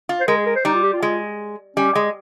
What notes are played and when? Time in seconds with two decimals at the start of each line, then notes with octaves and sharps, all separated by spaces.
0.09 F4
0.20 C5
0.28 G#3 A#4
0.37 G#4
0.46 A#4
0.56 C5
0.65 G3 D#4
0.74 F4
0.83 G4
0.93 F4
1.02 G#3
1.77 G3 C#4
1.95 G#3